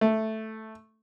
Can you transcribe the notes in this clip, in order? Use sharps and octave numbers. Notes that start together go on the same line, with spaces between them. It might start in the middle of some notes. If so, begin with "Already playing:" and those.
A3